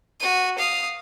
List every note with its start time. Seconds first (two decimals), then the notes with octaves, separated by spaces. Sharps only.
0.20 F#4 D#7
0.58 F5 D#6